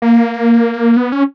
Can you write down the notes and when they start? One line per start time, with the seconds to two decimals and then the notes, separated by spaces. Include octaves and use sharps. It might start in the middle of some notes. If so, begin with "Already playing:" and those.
0.02 A#3
0.97 B3
1.12 C#4